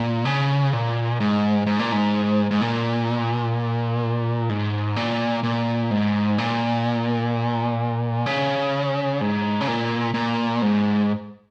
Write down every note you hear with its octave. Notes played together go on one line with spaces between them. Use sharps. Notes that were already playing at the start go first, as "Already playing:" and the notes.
Already playing: A#2
C#3
A#2
G#2
G#2
A#2
G#2
G#2
A#2
G#2
A#2
A#2
G#2
A#2
C#3
G#2
C#3
A#2
A#2
G#2